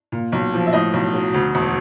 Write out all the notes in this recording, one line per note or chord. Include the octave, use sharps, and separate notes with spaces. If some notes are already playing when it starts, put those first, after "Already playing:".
A#2
B1
F3
E5
A2 D#5
B1
F#3
D2
E1